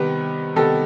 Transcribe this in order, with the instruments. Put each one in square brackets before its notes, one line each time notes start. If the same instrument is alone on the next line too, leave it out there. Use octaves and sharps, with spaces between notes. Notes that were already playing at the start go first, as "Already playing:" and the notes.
Already playing: [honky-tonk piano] C3 D#3 G3 B3 B4
C3 D#3 G3 B3 A4